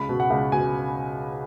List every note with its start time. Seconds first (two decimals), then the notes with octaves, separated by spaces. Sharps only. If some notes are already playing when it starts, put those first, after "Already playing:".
Already playing: C#2 B5
0.09 B2
0.20 F#5
0.30 C#2
0.52 B2 G#5